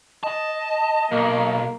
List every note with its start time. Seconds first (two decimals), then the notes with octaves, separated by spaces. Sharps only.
0.23 D#5 A5
1.12 B1 A#3